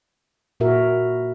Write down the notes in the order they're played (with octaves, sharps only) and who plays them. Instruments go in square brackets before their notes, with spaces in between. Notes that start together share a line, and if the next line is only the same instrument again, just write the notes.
[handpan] A#2 E4 F#4 A#4 E5